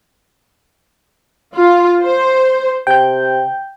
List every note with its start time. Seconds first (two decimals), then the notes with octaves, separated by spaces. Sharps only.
1.55 F4
2.01 C5
2.87 C3 G5 G6